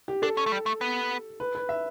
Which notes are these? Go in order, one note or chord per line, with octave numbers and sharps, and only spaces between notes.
G4
D4 A4
C#4
A3
G3
A3
B3
B4
B4
E5